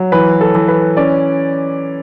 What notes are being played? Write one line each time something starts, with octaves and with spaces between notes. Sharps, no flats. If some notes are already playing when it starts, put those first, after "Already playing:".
Already playing: F#3
E3 B4
A4
E3
B4
C#4 D5